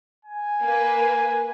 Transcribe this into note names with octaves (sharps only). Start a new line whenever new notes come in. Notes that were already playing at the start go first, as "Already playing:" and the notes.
G#5
A#3 B4